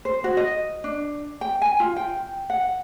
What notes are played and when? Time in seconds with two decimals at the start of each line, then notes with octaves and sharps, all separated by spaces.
0.05 C5
0.24 F#4
0.37 D#5
0.84 D4
1.41 G5
1.62 G#5
1.80 F4
1.96 G5
2.50 F#5